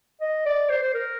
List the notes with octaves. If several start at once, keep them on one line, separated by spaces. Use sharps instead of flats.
D#5
D5
C5
C5
A#4